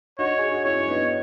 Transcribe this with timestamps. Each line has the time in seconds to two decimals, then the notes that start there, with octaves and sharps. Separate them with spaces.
0.19 D#4 F#4 C#5
0.38 G#4
0.52 F#4
0.65 C#4 E4 C#5
0.88 B3 D#4